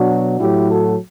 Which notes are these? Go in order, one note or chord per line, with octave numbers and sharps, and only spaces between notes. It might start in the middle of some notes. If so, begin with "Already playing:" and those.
Already playing: B2 F#3 D4 F#4
A2 F#3 E4 G4
F#4 A4